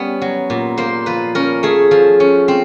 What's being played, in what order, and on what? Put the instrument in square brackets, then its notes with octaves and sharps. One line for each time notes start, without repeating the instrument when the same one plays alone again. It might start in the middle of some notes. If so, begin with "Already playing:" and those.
Already playing: [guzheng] G3 B3 C#4
F#3
A#2
A#3 C5
F3 B4
C#4 A#4
A3 G#4
F3
C#4
C4